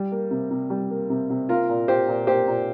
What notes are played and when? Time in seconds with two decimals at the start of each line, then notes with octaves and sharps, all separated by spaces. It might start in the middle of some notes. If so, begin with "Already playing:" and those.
Already playing: G3
0.12 A#3
0.31 C3
0.50 C3
0.70 G3
0.90 A#3
1.10 C3
1.30 C3
1.49 A#3 F4 A#4
1.69 A#2
1.88 A#3 G4 C5
2.08 A#2
2.27 A#3 G4 C5
2.47 A#2